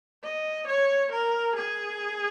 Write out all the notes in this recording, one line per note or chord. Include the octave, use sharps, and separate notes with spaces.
D#5
C#5
A#4
G#4